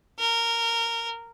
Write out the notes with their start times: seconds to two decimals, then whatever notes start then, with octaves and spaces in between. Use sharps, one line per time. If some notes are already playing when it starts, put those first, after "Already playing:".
0.19 A#4